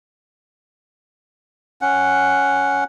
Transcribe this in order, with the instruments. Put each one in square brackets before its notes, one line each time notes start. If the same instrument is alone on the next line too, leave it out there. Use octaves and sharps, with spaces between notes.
[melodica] C#4 F#5